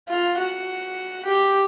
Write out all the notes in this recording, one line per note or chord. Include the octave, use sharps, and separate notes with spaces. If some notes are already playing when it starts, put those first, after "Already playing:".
F4
F#4
G4